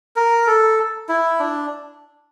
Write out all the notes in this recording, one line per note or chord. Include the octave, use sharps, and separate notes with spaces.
A#4
A4
E4
D4